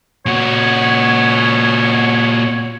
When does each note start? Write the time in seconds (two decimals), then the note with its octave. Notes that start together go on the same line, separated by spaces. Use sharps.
0.26 A#2 F#4 C#5